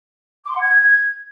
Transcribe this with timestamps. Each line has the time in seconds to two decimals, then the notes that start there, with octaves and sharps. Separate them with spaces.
0.44 D6
0.50 C6
0.55 F#5
0.60 G#6